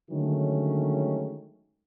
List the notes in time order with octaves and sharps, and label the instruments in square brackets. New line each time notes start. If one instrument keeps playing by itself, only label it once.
[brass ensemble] D3 D#3 F#3 G#3 A3 C#4